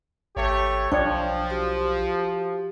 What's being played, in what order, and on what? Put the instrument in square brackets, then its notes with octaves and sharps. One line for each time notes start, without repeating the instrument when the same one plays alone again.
[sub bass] G#1 [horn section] A3 G4 C#5
[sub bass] B1 [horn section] F3 [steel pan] D4 C#5 [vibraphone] G5
[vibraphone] F#4 G4